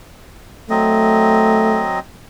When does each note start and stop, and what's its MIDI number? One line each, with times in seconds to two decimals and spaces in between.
0.70 1.99 54
0.70 1.84 57
0.70 1.99 60
0.70 1.99 75